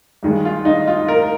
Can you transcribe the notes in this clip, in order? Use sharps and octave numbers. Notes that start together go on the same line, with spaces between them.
G2 D#3 G#3
F4
D#4
F4
A#4